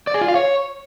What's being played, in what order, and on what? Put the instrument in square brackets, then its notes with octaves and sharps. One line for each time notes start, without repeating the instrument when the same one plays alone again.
[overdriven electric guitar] D5
G#4
F4
F5
C#5